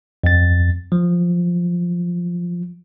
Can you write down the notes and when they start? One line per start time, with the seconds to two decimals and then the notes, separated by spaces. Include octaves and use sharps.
0.23 F2 A6
0.92 F3